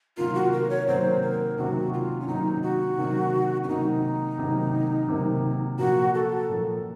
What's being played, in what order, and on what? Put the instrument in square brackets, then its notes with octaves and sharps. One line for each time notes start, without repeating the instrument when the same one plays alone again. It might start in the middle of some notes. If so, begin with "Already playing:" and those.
[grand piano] C3 D#3 F#3 A#3 [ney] F4
[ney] F#4
A#4
C#5
[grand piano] C3 D#3 F#3 A#3 [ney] C5
[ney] A#4
[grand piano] C3 D#3 F#3 A#3 [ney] F#4
[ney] F4
C#4
[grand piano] C3 D#3 F#3 A#3 [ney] D#4
[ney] F#4
[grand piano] C3 D#3 F#3 A#3
[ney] C#4
[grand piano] C3 D#3 F#3 A#3 [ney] D#4
[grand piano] C3 D#3 F#3 A#3
C3 D#3 F#3 A#3
[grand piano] A#2 F3 A#3 [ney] F#4
[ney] A4
[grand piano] A#2 F3 A#3